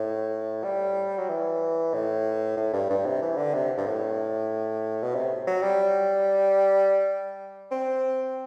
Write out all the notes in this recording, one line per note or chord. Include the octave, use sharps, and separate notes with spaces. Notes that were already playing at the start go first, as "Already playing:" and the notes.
Already playing: A2
G3
F#3
E3
A2
A2
G2
G2
C3
E3
D3
C3
G2
A2
B2
C3
F#3
G3
C4